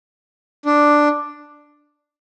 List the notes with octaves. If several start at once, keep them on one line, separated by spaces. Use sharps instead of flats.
D4